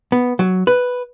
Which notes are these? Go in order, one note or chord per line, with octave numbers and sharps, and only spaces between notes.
B3
F#3
B4